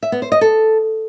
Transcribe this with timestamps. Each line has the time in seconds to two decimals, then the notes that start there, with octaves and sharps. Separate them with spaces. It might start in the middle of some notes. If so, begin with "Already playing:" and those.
0.03 E5
0.12 B3
0.22 C5
0.32 D#5
0.41 A4